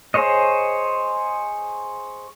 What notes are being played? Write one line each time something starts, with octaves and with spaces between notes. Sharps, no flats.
G#4 C5 C#5 D#5